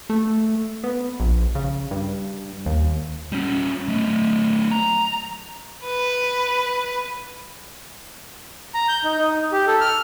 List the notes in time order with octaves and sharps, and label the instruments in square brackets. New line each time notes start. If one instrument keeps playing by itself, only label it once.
[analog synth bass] A3
B3
A#1
C#3
G2
D#2
[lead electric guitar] G3 C#4
F#3 A3
A#5
[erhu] B4
[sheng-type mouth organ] A#5
G6
D#4
D#4
G4
A4
F6